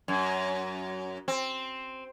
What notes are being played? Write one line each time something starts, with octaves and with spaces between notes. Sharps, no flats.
F#2
C4